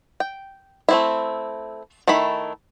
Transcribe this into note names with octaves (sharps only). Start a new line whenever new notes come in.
G5
A3 C4 E4
D#3 A3 E4 B5